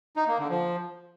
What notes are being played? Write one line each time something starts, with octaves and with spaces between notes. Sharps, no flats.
D#4
A#3
D3
F3